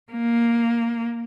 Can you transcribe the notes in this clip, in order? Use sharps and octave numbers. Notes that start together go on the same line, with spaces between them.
A#3